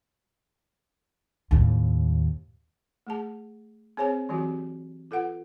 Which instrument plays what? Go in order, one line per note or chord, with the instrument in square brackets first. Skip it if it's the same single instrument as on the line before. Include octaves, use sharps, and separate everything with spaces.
[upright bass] D#2 A2
[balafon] A3 G#4 A5
C4 G#4 C5 C#5 G#5 A5
E3 F#3 C4 F#4 G4
F4 A4 B4 F#5